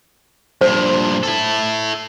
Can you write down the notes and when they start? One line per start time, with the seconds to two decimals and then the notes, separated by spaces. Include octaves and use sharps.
0.61 G2 A#2 C5
1.23 E4 A4